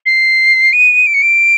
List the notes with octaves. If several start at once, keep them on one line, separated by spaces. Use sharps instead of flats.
C7
D#7
D7
C#7
D7